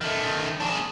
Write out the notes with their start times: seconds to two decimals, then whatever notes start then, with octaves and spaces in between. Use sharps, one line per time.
0.01 D#3 A3
0.61 D4 G#4